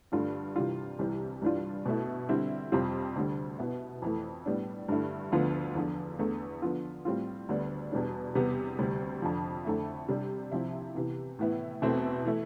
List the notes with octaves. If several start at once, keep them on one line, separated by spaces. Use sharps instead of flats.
G2 D3 A3 D4 F4
C3 E3 G3 D4 F4
C2 C3 E3 G3
G2 E3 G3 D4 F4
B2 A3 E4
D3 G3 C4 E4
F2 C3 G3 C4 F4
D2 D3 G3
B2 B3 E4
F2 E3 A3
A2 G3 B3 D4
G2 D3 A3 E4
D2 D3 F3 B3 F4
E2 D3 F3
E2 D3 A3
D3 F3 B3 F4
A2 G3 C4 F4
D2 D3 G3 B3 D4
E2 B2 G3 D4
E2 C3 G3 B3
D2 C3 G3
F2 D3 F3
F2 D3 A3 E4
C3 G3 D4
C2 C3 F3 C4 E4
C3 E3 B3
A2 E3 B3 E4
E2 B2 A3 C4 E4
E3 A3 E4